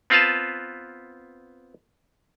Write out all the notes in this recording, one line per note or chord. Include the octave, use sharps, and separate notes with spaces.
B3 C4 F4 B4 F5 A5